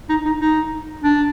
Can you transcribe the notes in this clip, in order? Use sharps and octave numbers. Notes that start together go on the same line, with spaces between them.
D#4
D#4
D#4
D4